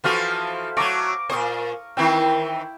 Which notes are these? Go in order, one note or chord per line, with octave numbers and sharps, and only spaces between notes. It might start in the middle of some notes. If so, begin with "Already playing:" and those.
E3 F3 F#4 A4 C5 F5
F#3 A3 A#5 C#6 D6
A#2 C5 C#6 D#6
D#3 E3 C4 E4 G5